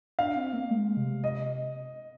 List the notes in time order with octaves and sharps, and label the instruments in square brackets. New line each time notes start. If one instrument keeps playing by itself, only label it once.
[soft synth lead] D4 [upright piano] F5
[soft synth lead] C4
A#3
G#3
C3
[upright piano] D#5